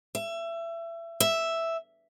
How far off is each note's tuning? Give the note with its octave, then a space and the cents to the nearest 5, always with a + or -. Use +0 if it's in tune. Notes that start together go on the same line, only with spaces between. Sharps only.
E5 +25
E5 +0